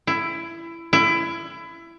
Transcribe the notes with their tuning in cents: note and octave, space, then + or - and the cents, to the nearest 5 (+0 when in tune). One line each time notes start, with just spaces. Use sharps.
E4 +20
E4 +25